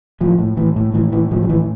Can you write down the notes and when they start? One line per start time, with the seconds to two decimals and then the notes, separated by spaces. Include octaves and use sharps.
0.21 A2 F3
0.39 A2
0.57 A2 E3
0.76 A2
0.94 A2 E3
1.12 A2 E3
1.31 A2 F3
1.43 F3
1.49 A2 E3